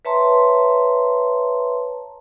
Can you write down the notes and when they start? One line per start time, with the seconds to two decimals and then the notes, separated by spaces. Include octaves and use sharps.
0.05 B4 C#5 E5 A5 A#5 C6